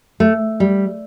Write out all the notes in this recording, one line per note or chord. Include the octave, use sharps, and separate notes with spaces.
A3
G3